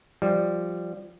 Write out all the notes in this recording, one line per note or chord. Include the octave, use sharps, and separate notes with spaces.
F3 G3